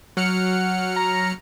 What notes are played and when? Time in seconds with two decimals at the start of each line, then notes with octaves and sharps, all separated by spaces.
0.17 F#3 F#5 F6 C#7
0.96 A#5